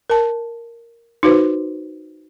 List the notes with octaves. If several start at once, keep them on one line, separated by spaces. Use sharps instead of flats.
A#4 A5
D#4 F#4 B4 C5